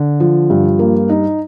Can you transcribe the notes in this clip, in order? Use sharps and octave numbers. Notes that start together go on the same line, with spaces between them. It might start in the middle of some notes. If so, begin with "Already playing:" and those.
Already playing: D3
F3
G2
A#3
D#4